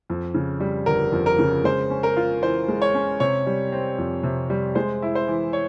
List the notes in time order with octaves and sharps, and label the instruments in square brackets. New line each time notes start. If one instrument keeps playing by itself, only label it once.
[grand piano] F2
C#3
G3
[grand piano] G1 [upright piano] A#4
[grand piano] F2
[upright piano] A#4
[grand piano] C#3
[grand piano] G#3 [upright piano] C5
[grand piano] C#4
[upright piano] A#4
[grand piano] F4
[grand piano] E3 [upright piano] C5
[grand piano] G#3
[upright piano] C#5
[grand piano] C#4
[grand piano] C3 [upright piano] C#5
[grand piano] G3
C4
F2
C3
G3
[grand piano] G#3 [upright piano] C5
[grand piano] E4
[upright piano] C5
[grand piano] E3
[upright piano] C#5